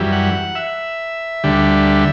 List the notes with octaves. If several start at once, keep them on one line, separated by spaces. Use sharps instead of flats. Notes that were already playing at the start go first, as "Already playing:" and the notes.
Already playing: F#2 E3 G3
F#5
E5
D2 D3 G3